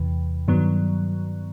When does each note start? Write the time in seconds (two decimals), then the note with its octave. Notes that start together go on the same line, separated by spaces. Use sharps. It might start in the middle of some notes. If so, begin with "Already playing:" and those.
Already playing: E2 C3 E3
0.48 G2 D#3 F#3 B3